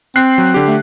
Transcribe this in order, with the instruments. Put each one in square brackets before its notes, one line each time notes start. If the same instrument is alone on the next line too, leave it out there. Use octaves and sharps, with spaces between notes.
[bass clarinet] C4 [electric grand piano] F#6 C7
[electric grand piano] F#3
D3 G4
[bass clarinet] A3